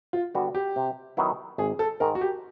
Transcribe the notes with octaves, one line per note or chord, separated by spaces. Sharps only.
F4
D3 G3 B3 F#4
G4
C3
D#3 F#3 B3 E4
G#1 G#4
A4
G#2 D#3 G#3 A#4
F#4
G4